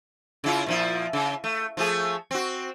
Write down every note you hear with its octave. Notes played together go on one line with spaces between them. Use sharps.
C#3 E4 F4
A#2 F3 E4
C#3
A3
F3 A3 G#4
C4 F#4